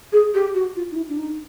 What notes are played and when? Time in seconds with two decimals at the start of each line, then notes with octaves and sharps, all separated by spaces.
0.13 G#4
0.34 G4
0.54 F#4
0.76 F4
0.91 D#4
0.96 E4
1.09 D4
1.17 D#4